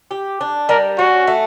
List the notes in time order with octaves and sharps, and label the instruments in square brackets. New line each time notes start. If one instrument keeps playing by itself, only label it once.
[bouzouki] G4
D4
[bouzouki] G3 [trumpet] A#4
[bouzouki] C#4 [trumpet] F#4
[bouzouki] A3